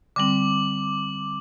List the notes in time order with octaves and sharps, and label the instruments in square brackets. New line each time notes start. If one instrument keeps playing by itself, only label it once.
[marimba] D3 G3 C4 [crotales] D6 F#7